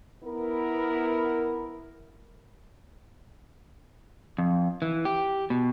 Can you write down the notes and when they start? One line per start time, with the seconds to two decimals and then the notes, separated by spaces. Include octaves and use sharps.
0.24 B3 E4 A#4
4.38 F2
4.82 E3
5.05 G4
5.50 B2